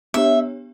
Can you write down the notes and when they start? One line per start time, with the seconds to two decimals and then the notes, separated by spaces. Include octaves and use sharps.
0.14 B3 D4 G4 C#5 E5